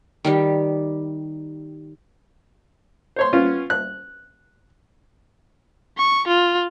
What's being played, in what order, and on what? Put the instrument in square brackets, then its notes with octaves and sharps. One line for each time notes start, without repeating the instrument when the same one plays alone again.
[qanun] D#3 G3 G4
[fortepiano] C5 C#5 C6
B3 C#4 F4
F#6
[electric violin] C#6
F4